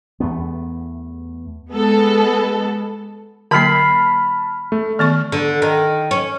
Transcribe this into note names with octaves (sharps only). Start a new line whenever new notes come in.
E2 A3 B3
G#3 B3 A4
D3 F#3 A#3 A5 B5 F6 B6 C7
A3
D#3 B3 C#6 F6
D3
D#3
C#4